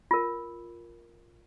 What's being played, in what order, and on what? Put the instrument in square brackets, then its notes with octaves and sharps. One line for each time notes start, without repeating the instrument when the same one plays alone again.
[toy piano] F4 A#4